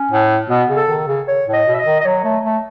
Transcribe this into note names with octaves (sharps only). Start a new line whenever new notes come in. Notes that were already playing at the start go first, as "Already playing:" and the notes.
Already playing: C#4
A2
B2 B3
C#3
A4
D#3
C#3
C#5
A2
D#5
B2
E5
D#5
D#3
D#5
F#3 C#5
A3
A3